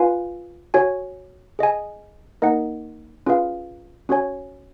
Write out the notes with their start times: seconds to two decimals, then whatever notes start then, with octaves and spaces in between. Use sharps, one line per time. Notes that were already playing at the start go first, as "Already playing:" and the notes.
Already playing: F4 B4 F5 G#5
0.74 F#4 C#5 G#5
1.59 G#4 D#5 G#5
2.42 A#3 D#4 A#4 D#5 F#5
3.26 C#4 F4 G#4 B4 F5
4.09 C#4 F#4 C#5 G#5